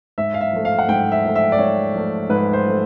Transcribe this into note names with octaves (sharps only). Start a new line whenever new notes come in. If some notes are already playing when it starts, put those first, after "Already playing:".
G#2 E5
F5
E5
F3 A3
F5
F#5
G#2 G5
E5
F3 A3
E5
D5
G#2 C#5
F3 A3
G#2 B4
C5
F3 A3